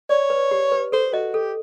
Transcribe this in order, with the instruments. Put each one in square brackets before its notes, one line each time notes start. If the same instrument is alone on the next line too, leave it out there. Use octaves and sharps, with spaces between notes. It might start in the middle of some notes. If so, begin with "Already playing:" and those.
[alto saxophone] C#5 [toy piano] D5
[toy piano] B4
G4
B4
[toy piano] A4 [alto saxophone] C5
[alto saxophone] F#4 [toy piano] D#5
[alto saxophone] G4 [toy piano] A4